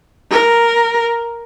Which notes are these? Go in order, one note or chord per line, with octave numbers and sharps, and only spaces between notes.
A#4